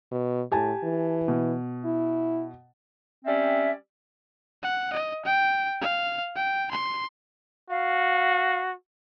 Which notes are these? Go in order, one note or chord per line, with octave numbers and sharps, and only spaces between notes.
B2
A2 G4 G#5 A5
E3
B2
E4
G3 C4 C#4 D5 E5
F#5
D#5
G5
F5
G5
C6
F#4 F5